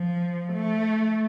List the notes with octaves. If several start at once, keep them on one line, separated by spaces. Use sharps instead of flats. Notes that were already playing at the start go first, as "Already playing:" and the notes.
Already playing: F3
A3